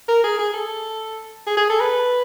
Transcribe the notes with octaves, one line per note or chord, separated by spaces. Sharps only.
A#4
G#4
G#4
A4
G#4
G#4
A4
B4